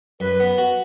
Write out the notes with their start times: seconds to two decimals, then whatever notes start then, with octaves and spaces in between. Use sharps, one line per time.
0.20 F#2 B4
0.40 B3
0.58 F#4